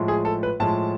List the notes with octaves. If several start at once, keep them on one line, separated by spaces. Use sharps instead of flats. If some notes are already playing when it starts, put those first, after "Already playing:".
Already playing: A2 F3 G#3
G#4
A4
B4
A2 F3 G#3 A5